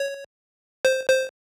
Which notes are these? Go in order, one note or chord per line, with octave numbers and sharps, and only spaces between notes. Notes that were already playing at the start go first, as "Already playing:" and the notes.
Already playing: C#5
C5
C5